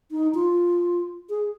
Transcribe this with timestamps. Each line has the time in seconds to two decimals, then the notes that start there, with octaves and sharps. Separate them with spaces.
0.11 D#4
0.35 F4
1.30 G#4